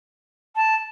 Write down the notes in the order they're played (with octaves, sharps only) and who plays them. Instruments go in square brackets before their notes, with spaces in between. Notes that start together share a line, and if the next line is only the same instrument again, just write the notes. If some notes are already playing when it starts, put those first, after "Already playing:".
[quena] A5